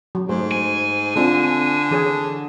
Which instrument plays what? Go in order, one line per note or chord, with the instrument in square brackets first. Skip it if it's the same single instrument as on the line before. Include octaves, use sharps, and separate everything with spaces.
[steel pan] F#3
[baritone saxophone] G#2 [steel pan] A3 [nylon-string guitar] C5
[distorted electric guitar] G#5
[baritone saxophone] D3 [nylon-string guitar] C4 D4 F4
[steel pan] E3 G#4 C#5